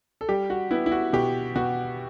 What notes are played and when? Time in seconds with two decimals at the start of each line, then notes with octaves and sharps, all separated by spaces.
0.21 A4
0.29 G3 G4
0.50 F#4
0.71 B3 E4
0.86 E4
0.92 F#4
1.13 B2 G4
1.55 B2 F#4